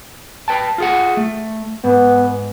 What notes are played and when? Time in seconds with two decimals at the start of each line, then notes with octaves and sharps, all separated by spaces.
0.48 B4 G5 A5
0.78 F4 G#4 F#5
1.17 A3
1.84 G#2 B3